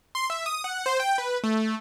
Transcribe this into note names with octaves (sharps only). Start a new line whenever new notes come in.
C6
E5
D#6
F#5
C5
G5
B4
A3